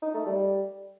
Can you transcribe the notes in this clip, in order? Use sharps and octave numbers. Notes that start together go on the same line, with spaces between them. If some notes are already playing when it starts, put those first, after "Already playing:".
D#4
A3
G3